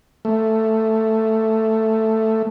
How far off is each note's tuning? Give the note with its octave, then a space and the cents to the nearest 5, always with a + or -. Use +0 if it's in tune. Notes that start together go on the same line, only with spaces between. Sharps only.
A3 +5